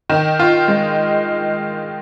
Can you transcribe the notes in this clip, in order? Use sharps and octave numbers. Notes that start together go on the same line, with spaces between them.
D#3
F4
G#3